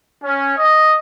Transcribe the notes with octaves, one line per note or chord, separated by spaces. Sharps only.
C#4
D#5